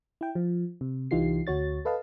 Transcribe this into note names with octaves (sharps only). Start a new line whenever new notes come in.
E4 G5
F3
C3
C2 E3 D#4 F4 G4 C7
D2 F#4 C#5 A6
A4 B4 D#5 F5 A5